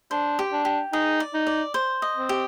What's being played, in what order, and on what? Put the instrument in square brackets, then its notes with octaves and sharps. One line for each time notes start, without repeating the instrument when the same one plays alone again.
[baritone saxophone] D4 [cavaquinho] C5
[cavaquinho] G4
[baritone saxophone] D4
[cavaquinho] G4
[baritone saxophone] D#4 [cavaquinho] G#4
[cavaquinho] D5
[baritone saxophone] D#4
[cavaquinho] D5
C5
D#5
[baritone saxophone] C4
[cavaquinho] G4